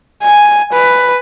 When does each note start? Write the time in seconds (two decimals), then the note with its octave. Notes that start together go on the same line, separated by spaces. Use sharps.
0.23 G#5
0.72 B4